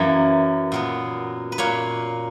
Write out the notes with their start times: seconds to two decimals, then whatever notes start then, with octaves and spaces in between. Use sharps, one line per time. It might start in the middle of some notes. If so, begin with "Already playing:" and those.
Already playing: F#2 E3 A#3 C#5
0.72 A#2 F#3 B3
1.52 B4
1.58 A#2 A#3 C#5